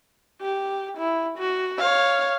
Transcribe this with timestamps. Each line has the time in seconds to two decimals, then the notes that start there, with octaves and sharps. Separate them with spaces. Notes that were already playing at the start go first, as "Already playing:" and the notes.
0.42 G4
0.98 E4
1.38 F#4
1.79 C#5 F5